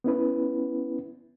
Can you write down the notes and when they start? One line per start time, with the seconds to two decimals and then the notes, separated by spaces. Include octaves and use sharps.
0.04 B3 C#4 E4 B4